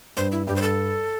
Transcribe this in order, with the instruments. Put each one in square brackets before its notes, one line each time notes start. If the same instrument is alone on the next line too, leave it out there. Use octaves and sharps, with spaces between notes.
[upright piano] G2 [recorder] C5
[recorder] E4
[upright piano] G2 [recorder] G4
[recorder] C5
A4